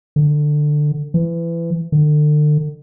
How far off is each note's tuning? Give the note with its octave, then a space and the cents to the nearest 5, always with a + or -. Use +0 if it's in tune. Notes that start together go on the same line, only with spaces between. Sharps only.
D3 +15
E3 +25
D3 +35